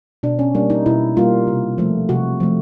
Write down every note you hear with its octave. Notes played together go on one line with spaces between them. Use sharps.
B2 D4
C#4
G3 A#3 D4
D#4
B2 E4
G3 A#3 F4
C3
F3 A3
C3 F#4
F3 A3